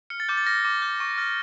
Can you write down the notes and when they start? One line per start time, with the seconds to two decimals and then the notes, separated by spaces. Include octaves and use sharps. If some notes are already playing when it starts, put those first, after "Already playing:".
0.10 F6 C#7
0.20 A6
0.29 D6 G6
0.37 A6
0.46 F6 A#6
0.65 D6
0.82 G6
1.00 C#6
1.18 F6 A6